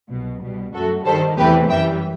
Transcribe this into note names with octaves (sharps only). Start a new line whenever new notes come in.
C2 B2 F#3
C2 B2 G3
F#2 F#3 A3 F#4 A4
G2 D#3 G3 A4 C5
E2 C3 E3 A3 G4 B4
F#2 E3 G3 E5 G5